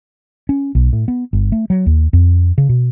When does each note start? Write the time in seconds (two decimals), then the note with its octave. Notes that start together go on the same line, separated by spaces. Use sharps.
0.49 C#4
0.75 B1
0.93 A2
1.08 B3
1.33 G1
1.52 A3
1.70 F#3
1.86 D#2
2.13 F2
2.58 C#3
2.69 B2